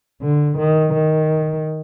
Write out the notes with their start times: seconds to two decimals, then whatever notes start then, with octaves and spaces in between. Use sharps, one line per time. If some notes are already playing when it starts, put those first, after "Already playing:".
0.22 D3
0.58 D#3
0.94 D#3